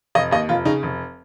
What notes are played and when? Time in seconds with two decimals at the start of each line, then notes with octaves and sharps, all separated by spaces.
0.15 F1 D#5
0.31 D#2 D#5
0.49 F1 F4
0.65 C#3 D#4
0.83 F1